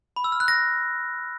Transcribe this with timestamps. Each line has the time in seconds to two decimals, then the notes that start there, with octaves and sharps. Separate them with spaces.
0.16 B5
0.24 E6
0.32 F6
0.40 F#6
0.48 A#6